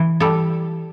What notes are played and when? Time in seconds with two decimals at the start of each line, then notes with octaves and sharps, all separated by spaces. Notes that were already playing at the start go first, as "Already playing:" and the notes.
Already playing: E3
0.20 G3 A4